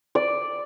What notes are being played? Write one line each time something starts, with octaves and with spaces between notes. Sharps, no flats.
D5